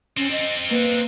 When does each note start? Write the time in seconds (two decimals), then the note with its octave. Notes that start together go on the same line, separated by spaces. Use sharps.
0.17 C4 C#4 A4
0.31 D#5
0.71 A#3 B4 F5